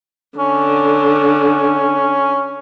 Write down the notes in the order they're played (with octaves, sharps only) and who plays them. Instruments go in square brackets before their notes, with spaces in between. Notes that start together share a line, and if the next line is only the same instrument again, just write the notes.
[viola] D3 [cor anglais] C#4